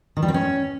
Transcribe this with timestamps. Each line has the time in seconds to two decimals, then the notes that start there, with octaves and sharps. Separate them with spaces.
0.17 D#3
0.22 G3
0.28 C4
0.34 C#4